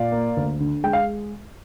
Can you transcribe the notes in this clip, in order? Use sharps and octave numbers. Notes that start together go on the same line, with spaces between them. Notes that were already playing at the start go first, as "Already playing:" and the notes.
Already playing: A#2 D5 F5
A#3
D2
D3
G#3 G5
F5